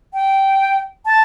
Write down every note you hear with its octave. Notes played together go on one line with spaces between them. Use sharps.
G5
A5